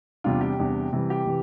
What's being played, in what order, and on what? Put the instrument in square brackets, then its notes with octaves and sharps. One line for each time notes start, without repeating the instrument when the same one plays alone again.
[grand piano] E2 C3 G3 D4 F4
G4
E2 C3 G3 D4
C3 E3 G3
G4
C3 E3